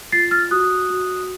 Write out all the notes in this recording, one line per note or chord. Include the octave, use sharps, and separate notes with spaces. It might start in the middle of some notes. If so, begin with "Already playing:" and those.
F4 A6 C7
F6 A6
F#4 D#6 F#6
F#4